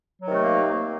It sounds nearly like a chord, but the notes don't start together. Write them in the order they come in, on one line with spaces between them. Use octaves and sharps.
F#3 D#3 C3 A3 A#3